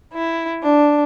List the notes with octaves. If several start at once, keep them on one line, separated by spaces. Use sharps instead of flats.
E4
D4